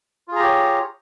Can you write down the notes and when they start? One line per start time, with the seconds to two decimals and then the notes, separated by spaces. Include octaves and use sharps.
0.28 F4
0.32 G#4
0.36 A#5
0.40 G4
0.44 C#5